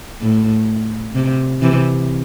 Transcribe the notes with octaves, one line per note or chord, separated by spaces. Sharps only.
A2
C3
C3 E3